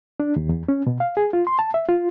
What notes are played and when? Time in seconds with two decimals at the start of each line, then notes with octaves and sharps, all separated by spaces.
0.20 D4
0.36 D#2
0.49 E2
0.69 C#4
0.87 B2
1.00 F5
1.17 G#4
1.33 F4
1.47 C6
1.59 A5
1.74 E5
1.88 F4